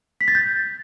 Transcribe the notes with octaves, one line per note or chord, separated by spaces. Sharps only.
B6
A6
G6